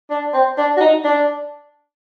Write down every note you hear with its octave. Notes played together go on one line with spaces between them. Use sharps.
D4
C4
D4
F#4
D#4
D4